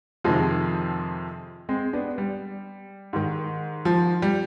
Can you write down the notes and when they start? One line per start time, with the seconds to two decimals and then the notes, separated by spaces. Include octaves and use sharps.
0.24 F2 C3 D#3 F3 G#3
1.69 G#3 C4
1.93 B3 D4
2.18 G3
3.13 G#2 D#3
3.85 F3
4.22 G3